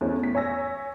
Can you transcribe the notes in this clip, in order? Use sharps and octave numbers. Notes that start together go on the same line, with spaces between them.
E2 A3 C#4
B6
C#5 G#5 E6 A#6